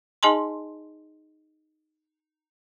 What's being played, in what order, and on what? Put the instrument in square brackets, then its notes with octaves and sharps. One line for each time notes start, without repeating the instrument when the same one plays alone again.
[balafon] D#4 G#4 D#5 G#5 A5 C6